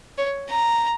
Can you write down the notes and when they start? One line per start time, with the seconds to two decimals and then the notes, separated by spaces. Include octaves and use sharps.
0.18 C#5
0.50 A#5